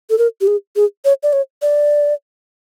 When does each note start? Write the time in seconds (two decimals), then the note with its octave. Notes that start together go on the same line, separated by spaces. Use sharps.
0.10 A4
0.18 A#4
0.41 G4
0.47 G#4
0.76 G#4
1.05 C#5
1.23 D5
1.33 C#5
1.62 D5